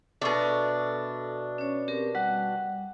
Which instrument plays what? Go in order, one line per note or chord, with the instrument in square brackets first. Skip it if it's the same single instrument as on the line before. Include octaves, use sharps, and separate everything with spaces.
[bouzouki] B2 D4 [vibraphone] A4 [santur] E5 C#6
[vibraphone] C#4 C#5
C4 G4 A#4
[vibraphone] G3 [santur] F#5